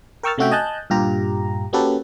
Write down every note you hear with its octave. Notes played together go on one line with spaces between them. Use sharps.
A#4 G5 C#6 E6 F6 A6
C3 A3 C#4 F#4 E5 G5
D#5 G#5 A5 F#6 G6
G2 A#2 F4 G4 A#5
A#3 C#4 F#4 G4 A4 B4